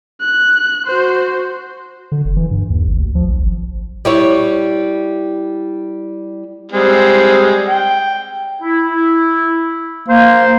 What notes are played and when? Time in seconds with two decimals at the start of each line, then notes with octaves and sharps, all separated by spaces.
0.21 F#6
0.87 F#4 C5
2.12 D3
2.25 F1
2.37 E3
2.51 G2
2.70 D#2
2.88 G#1
3.00 D2
3.15 F3
3.28 B1
3.42 G#1
4.05 G3 E4 C#5
6.72 G3 G#3 C4
7.68 G5
8.62 E4
10.09 A#3 C5